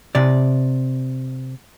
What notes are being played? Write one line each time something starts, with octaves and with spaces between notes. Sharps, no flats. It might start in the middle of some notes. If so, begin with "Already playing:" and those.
C3 D5